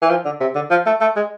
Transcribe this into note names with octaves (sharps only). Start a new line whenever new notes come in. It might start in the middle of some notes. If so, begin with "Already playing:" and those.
E3
F3
D3
C3
D3
F3
A3
A3
G#3